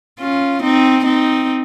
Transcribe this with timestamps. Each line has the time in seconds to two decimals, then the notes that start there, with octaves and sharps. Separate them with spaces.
0.20 C#4 F4
0.62 C4 D#4
1.04 C4 D#4